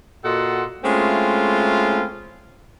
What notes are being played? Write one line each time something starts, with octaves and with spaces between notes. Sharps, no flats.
A#2 F#4 A4 D#5 F#5 C6
G#3 A3 C4 C#4 E4 F4